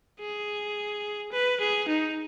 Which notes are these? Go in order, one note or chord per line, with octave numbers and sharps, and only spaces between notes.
G#4
B4
G#4
D#4